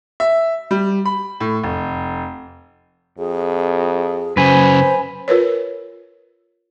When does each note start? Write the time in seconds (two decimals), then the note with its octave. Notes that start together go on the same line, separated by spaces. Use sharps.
0.20 E5
0.71 G3
1.06 B5
1.40 A2
1.64 F1
3.18 F2 G#4
4.37 F#2 C#3 B4 C5 G#5
5.28 F4 A#4 B4 C#5